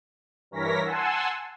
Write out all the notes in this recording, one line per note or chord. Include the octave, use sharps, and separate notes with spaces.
G2 E3 A#4 C#5 A#6 B6
F#5 G#5 A5 C6 E6